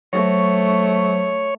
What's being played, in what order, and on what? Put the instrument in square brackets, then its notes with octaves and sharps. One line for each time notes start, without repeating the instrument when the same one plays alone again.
[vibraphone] F#3 C5 C#6 [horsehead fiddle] A3 [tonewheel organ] C#5